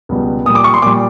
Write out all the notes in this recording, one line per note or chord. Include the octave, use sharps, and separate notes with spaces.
C#2 B2 G3
A#2 G3 D#6
D6
C#6
C6
A#2 G3 D6